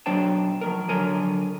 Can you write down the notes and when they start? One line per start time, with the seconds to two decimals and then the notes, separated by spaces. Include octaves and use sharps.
0.06 B1 F#3 D4 C5 G5 A5
0.61 F3 F#3 A#4
0.89 D3 F#3 A#4 G#5